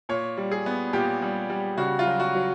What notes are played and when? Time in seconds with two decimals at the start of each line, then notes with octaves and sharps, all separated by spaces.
0.09 A#2 C#5
0.37 G3
0.51 G#4
0.66 B3
0.93 A#2 G4
1.22 G3
1.50 G3
1.78 C#3 F#4
1.99 F4
2.06 F#3
2.20 F#4
2.35 F#3